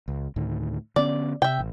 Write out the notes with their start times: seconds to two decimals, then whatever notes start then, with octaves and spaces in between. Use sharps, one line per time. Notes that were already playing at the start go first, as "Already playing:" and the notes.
0.08 C#2
0.36 D2 A2 D#3
0.96 D3 B3 C#4 D5
1.42 C3 E5 G5
1.59 A1